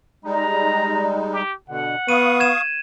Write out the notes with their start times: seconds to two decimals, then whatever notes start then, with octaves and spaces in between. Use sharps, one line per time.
0.25 G3 G#3 D#4 A#5
1.32 G4
1.69 B2 D3 F#5
2.09 B3 F5 C#6 D#6 D#7
2.40 G#6 E7